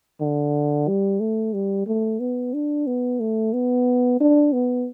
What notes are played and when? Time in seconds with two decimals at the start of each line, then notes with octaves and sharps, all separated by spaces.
0.21 D3
0.88 G3
1.20 A3
1.54 G3
1.87 A3
2.20 B3
2.54 D4
2.87 B3
3.20 A3
3.53 B3
4.21 D4
4.53 B3